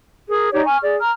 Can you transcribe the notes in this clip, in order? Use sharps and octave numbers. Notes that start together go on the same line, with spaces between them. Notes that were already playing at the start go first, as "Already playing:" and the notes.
G#4 A#4
D#4 G4 C#5 D5
G#5 C#6 F6
G#4 D5
A#5 F6